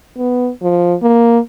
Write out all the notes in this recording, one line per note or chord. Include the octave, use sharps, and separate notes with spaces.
B3
F3
A#3